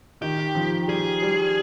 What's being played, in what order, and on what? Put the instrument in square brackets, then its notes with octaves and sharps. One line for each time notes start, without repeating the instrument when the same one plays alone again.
[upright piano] D#3 [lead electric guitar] G4
[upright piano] F3
[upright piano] G3 [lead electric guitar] G#4
[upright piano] G3